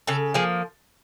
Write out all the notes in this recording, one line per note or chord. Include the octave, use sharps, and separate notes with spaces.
C#3 A4
F3 A#3 G#4